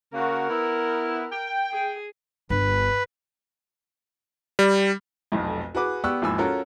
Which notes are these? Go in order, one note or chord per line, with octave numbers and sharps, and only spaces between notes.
C#3 A#3 F#4 A#4
B3 E4
G5
G#4
G1 B4
G3
F1 B1 F2
F#4 G#4 B4 D6
B3 G4 D5 C#6 E6 F#6
G#1 D#2 F3 G#5 B5 E6
C#4 F4 F#4 A4 A#4